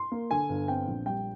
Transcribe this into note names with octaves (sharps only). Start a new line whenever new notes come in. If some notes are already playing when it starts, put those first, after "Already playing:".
Already playing: C6
A#3
D3 G#5
G1
C4 G5
A#1
G3 G5